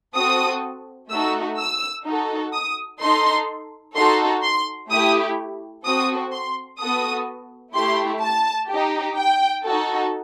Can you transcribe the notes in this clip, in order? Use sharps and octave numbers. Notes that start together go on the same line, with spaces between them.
C4 F#4 A4 D#6
A3 D#4 F#4 A4 E6
E6
D#4 F#4 A4
D#6
D#4 A4 C6
D#4 F#4 A4 C6
C6
A3 E4 G4 D#6
C4 F#4 A4 D#6
C6
B3 F#4 A4 D#6
A3 E4 G4 C6
A5
D#4 G4
G5
D#4 F#4 A4